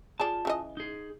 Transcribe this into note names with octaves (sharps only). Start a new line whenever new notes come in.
F4 G#4 D5 A5
C#3 E3 D#5
D#4 G#4